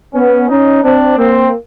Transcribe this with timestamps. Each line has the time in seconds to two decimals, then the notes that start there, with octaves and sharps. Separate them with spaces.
0.14 B3 C#4
0.48 C#4 D#4
0.83 C4 D4
1.18 A#3 C4